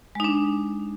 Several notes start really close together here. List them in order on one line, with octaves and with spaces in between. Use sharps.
G#3 D#4 D4